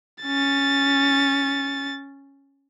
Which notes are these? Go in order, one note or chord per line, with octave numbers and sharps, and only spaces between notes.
C#4 A6